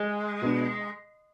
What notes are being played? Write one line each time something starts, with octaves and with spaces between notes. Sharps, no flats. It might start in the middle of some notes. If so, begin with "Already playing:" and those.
Already playing: G#3
B2 B3 D4